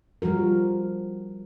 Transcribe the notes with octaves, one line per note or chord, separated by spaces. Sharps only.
F3 G3 F#4 A#4